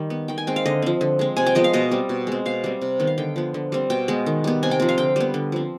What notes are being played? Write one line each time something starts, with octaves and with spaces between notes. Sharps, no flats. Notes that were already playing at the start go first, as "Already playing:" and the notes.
Already playing: D#3 G3
B3
D#3 G5
G#5
G#3 C4 G5
F5
D3 D#5
F3 C4
D3
G#3 C4
C3 G#5
G5
F3 G#3 B3 D#5
F5
B2 D#5
G3 C4
B2
G#3 C4
B2 F5
G3 C4
C3
D#3 B3
F5
D3 G5
F3 B3
D3
G3 C4
B2 G5
G#3 B3
D#3
G3 B3
C3 G#5
G5
F3 C4
F5
D3 G5
G3 B3
D3
F3 C4